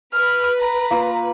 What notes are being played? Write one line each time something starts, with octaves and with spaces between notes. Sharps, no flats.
B4 F6
A#5
A#3 F4